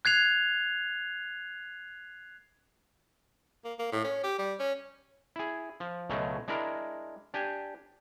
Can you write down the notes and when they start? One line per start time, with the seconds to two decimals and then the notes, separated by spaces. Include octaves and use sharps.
0.05 F#6 G#6 C7 F7
3.65 A#3
3.79 A#3
3.92 A2
4.04 C#4
4.23 G4
4.39 G3
4.59 C#4
5.36 E4 G#4
5.80 F3
6.09 C#2 B2 F#3 G#3 A3
6.48 G#3 D4 E4 A#4
7.34 D4 G4 G#5